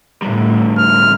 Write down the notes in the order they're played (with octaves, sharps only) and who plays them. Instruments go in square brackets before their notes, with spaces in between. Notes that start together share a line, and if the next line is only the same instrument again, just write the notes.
[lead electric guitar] D2 G3 [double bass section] A2
[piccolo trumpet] F6